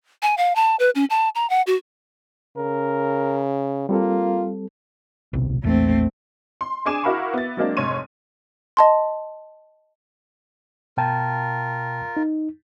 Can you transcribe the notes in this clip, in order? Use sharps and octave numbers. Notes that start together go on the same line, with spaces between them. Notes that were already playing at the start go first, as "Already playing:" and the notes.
G#5
F5
A5
B4
C#4
A5
A#5
F#5
F#4
C#3 A#4
G3 A#3 C4 F4 A4
D1 B1 C3
A#1 E2 A3 A#3 C4
C6
D4 G#4 G#5 D6 E7
E4 F#4 A#4 F5 B5 C#6
B3 E5 A6
F#3 G#3 A#3 C4 D4
F1 G#2 C#5 C6 D#7
D#5 A5 C6
B2 F4 A#4 G5 A5
D#4